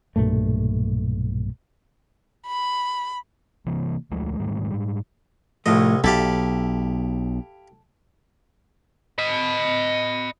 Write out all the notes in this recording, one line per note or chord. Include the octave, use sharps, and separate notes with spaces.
B1 G2 A#2 A3
B5
C3 E3 A#3
D2 F3 G#3 A3
G#2 D#3 G3 A3
G#2 G3
C2 A2 F3 A3 D#5
B1 E4 G4 A4 F5
D#5 B5